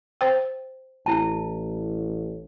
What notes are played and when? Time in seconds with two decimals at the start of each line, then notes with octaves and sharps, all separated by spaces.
0.21 C5 G5
1.06 A1 E4 A5